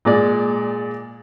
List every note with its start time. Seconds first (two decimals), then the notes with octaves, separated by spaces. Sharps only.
0.05 A#2 G#3 D5